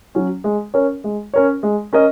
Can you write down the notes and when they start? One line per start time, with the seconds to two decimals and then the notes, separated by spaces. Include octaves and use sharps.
0.15 F#3 C#4
0.44 G#3
0.74 C#4 A#4 C#5
1.04 G#3
1.34 C#4 A#4 C#5
1.63 G#3
1.93 C#4 A#4 D#5